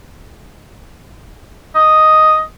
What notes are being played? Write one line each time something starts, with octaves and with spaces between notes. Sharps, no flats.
D#5